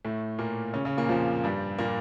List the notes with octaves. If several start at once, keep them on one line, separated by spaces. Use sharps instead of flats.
A2 A3
A#2 A#3
C#3 C#4
C#3 C#4
A#2 A#3
F2 F3
G2 G3
A#2 A#3